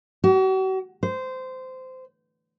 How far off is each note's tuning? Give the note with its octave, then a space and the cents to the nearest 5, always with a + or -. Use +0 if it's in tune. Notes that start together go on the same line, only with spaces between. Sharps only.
F#4 +40
C5 -20